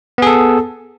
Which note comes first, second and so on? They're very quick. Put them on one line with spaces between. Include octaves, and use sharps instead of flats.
B3 G#4 A4